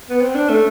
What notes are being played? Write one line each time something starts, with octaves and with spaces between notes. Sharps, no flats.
B3
C4
D4
A3